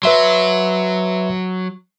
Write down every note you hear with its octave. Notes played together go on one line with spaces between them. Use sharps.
F#3 B4 E5 C6